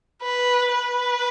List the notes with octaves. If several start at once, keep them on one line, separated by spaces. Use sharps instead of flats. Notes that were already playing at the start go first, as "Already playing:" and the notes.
B4
B4